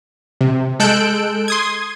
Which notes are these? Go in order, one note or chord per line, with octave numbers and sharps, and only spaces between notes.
C3
G#3 A4 E6 F#6 G6 D7
C6 D#6 G#6